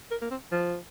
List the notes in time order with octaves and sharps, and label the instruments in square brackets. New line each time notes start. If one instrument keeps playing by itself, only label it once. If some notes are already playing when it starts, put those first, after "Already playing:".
[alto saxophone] A#4
A#3
C4
F3